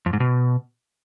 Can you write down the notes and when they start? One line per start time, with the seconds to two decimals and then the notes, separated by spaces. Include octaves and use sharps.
0.06 F2
0.13 G#2
0.20 B2